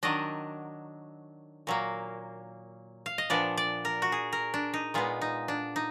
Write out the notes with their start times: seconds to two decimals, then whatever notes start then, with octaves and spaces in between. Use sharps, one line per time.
0.03 D#3 F#3 D4 D#5
1.67 A#2 F#3 A#3
3.06 F5
3.18 D#5
3.30 A#2 F3 B3 D4 D5
3.57 D5
3.85 A#4
4.02 F#4
4.12 G#4
4.32 A#4
4.54 D4
4.74 D#4
4.94 A#2 G#3 B3 F4
5.21 D#4
5.48 D4
5.76 D#4